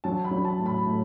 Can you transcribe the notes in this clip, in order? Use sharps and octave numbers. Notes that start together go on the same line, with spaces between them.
F#3 A5
B5
F#3
A5
A2
B5
A2